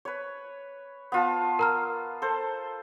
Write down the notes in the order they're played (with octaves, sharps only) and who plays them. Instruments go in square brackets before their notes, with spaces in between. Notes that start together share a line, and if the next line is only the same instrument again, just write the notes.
[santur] B4 C#5
B3 F4 A5
[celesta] A#4 A#5 F6
[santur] A4 C5